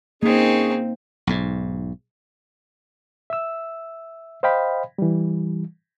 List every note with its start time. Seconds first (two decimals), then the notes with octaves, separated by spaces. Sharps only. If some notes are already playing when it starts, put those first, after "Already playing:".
0.23 A#3 C4 C#4 D#4 G#4
1.27 B1 G#2
3.30 E5 E6
4.43 C5 D#5 F5 G5 B5
4.98 E3 G3